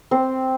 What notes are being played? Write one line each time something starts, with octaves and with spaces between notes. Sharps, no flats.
C4